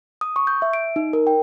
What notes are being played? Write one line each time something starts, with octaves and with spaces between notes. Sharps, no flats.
D#6
C#6
G6
E5
D7
D#4
A#4
G5